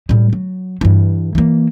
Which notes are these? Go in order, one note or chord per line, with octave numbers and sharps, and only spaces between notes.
A2 G3
F#3
G2 E3
E3 A#3